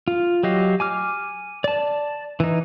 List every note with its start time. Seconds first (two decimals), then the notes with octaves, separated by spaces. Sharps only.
0.08 F4
0.43 F#3 G4 D#5 F5
0.80 G#5 D6 F6
1.64 D5 A5
2.40 E3 D#4